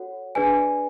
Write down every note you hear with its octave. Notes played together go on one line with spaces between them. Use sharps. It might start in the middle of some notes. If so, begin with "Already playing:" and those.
Already playing: F#4 A4 C#5 F#5
D4 G#4 B4 D5 G#5